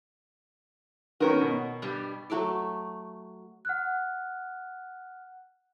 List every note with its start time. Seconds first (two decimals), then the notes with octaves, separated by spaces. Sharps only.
1.20 D#3 B3 C#4 F#4 A#4
1.41 B2
1.82 G2 G3
2.30 F#3 A3 E5 D6
3.65 F#5 F6 F#6